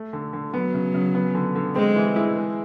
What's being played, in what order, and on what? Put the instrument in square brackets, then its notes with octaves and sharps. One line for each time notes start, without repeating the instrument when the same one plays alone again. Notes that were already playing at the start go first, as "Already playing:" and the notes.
Already playing: [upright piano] A3
D3
D3
[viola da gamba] F#3 [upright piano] B3
[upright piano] C#3
C#3
B3
D3
D3
[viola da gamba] G#3 [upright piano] C4
[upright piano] E3
E4
G#3